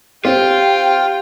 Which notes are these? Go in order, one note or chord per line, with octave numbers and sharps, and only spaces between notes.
C4 F4 G4 G5